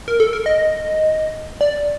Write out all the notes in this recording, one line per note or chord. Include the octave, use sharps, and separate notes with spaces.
A#4
A4
A#4
D#5
D5